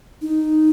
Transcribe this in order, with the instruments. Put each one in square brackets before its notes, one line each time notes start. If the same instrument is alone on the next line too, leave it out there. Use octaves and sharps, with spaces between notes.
[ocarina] D#4